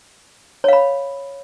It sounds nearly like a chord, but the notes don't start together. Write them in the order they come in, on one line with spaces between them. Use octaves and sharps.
C#5 F5 B5